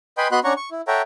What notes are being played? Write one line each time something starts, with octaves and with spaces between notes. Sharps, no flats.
B4 D#5 G5 G#5 B5 C6
B3 F#4 D#5 B5 C6 F#6
C#4 D4 C#5 F#5 A#5 C#6
C#6
E4
A4 C#5 E5 F#5 G5 A#5